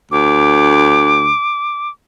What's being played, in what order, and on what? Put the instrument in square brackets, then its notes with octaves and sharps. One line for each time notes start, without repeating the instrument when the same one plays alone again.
[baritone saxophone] D2 [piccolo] D6